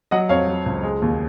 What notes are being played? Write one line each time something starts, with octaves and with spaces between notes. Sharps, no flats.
F#3 D#5 F#5
F2 C#5 F5
F#3
C#2
G#3
D#2